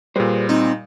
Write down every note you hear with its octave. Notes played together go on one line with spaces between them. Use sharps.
A#2 G3 G#4 B4 C5
C4 D#4